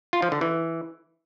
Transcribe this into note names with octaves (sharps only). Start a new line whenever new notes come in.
F4
F3
D3
E3